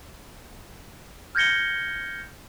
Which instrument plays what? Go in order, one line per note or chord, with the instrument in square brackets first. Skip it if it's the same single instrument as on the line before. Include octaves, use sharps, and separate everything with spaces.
[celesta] F6 G6 G#6 A#6 C#7 G7